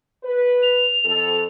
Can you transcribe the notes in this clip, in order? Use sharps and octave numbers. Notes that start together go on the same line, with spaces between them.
B4
F7
F2 A4